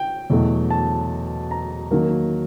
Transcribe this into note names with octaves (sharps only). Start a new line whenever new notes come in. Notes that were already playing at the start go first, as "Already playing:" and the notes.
Already playing: G5
E2 B2 F#3 A3
A5
A#5
D#3 F#3 A#3